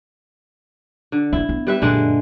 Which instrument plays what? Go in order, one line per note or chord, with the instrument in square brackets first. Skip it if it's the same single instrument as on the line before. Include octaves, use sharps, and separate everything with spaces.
[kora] D3
[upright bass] A#3 C4 [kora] E4
[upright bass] B3
[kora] G3 B4 E5
[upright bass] F#2 A#2 [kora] D3 G#3 D4